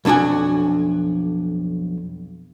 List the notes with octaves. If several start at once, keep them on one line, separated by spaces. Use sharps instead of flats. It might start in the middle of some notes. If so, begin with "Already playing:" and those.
B1 F2 D4 F#4 G#5